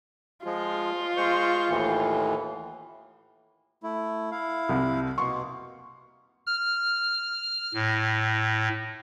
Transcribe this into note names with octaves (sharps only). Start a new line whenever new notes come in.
F3 G#3 F4
G#3 C5 C#6
D#2 A2 E3
A3 E4
E4 F5
C2 C3
B2 A#3 B3 C6 C#6
F6
A2